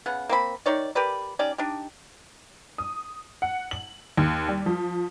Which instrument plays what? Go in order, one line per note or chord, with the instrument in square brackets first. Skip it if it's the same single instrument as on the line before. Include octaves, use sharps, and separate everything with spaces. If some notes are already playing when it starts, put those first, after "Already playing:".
[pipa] C#3 B3 F#5
A#3 C4 B5
D#3 D#4 C#5 D5
G4 A#4 B4 D5
C#4 D#4 G4 D5
D4 D#4 G4
[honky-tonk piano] D#6
F#5
F#7
D#2
G3
F3